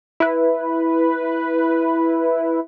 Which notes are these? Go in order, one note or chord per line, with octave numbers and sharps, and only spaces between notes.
E4 B4